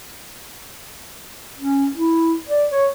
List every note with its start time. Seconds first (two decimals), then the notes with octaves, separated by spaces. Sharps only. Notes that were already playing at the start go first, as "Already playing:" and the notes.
1.58 C#4
1.95 E4
2.48 D5
2.71 C#5